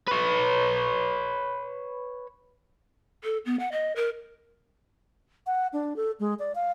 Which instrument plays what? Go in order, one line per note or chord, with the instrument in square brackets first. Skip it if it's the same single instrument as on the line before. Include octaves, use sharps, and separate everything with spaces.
[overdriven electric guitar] B4 C#5
[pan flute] A4
B3
F#5
D#5
A#4
[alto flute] F#5
D4
A4
G#3
D5
F5